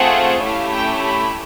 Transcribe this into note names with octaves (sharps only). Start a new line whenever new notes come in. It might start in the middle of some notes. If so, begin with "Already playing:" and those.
Already playing: A3 C4 F4 G#4 F#5
A3 C#4 E4 G4 F5
G5
B5